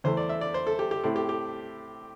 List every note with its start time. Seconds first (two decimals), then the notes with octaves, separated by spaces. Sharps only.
0.04 E2 E3 A3 C5
0.17 D5
0.29 E5
0.41 D5
0.54 C5
0.67 A4
0.79 G4
0.91 G4
1.04 A2 A3 C4 E4
1.16 G4
1.29 G4